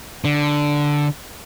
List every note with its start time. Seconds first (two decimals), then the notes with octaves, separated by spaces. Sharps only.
0.24 D3